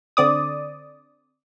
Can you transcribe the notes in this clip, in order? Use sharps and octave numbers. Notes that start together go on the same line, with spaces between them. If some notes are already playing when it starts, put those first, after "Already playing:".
D3 C4 D5 D#6